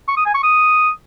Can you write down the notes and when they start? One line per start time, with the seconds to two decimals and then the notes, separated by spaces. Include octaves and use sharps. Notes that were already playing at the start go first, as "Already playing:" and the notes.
0.08 C#6
0.17 D#6
0.26 G#5
0.34 C#6
0.43 D#6